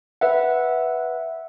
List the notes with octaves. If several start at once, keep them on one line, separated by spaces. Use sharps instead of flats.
B4 E5 F#5